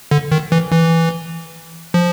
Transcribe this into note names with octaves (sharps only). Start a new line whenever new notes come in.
D3
D#3
E3
E3
F3